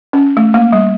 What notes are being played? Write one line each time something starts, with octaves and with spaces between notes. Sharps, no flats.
C#4
A3
A#3
G3